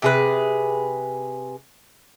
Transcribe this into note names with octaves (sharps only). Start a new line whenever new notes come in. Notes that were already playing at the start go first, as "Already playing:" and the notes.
C3 G#4 B4